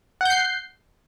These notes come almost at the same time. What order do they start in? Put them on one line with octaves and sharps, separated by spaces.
F#5 G6 C7